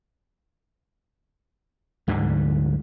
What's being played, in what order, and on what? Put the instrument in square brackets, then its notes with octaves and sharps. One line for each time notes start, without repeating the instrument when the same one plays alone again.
[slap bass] D2 G#2 D3 G3